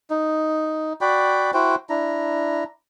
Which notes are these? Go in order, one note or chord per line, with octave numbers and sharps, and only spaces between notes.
D#4
F#4 D5 G5 B5
E4 F#4 C5 G5
D4 E4 A#5